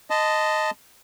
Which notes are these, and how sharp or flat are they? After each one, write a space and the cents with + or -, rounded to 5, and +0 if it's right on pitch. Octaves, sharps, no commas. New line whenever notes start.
D#5 +0 A5 +0 C6 -40